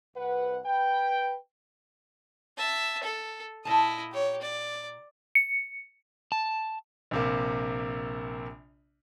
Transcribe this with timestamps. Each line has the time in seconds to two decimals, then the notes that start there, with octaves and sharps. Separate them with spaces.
0.16 C2 B4 F#5
0.66 B4 G5
2.57 E5 A5
3.03 A4
3.65 A#2 E4 D#5 A5
4.12 G4 C#5
4.42 D5
5.35 C#7
6.32 A5
7.11 A#1 C3 A#3